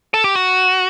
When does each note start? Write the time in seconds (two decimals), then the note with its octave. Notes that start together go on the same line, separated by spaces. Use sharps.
0.14 A4
0.24 G4
0.35 F#4